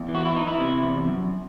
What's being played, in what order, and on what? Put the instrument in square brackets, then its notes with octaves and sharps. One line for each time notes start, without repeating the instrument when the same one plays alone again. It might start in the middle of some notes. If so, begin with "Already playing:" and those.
Already playing: [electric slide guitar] E2
E3
F#4
E4
E3 D#4
E4
C3
E2
F#2